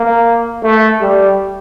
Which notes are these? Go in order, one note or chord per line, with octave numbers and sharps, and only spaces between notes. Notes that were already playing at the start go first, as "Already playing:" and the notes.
Already playing: A#3
A3
G3